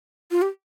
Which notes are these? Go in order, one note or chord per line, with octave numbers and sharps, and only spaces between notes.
F4
G4